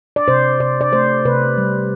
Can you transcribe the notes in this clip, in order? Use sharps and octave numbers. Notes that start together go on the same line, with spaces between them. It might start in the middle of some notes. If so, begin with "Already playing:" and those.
D5
C3 C5
C3 D5
D5
A3 C5
C3 B4
G3